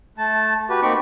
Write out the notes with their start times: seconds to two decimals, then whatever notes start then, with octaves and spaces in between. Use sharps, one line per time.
0.18 A3 A5
0.70 F#4 G4 B4
0.82 A#3 C4 D#4 B5 C#6 D6